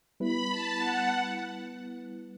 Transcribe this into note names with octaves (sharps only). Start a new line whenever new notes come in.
G3 B3 E4 B4 B5
A5
F#5